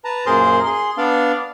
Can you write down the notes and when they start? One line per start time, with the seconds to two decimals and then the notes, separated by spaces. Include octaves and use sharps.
0.04 B4 A5 A#5
0.26 F#2 A#2 G#4 A#4 C5 C6
0.66 G#4 C6
0.97 B3 D4 D5 F5